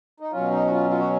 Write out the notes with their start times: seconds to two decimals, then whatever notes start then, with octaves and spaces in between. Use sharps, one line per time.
0.20 D#4
0.32 B2 F#3 C#4 F4
0.51 D#4
0.66 F#4
0.71 F4
0.90 F4
0.99 F#4